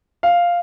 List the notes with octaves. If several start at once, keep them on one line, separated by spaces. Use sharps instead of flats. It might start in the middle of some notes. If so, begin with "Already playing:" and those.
F5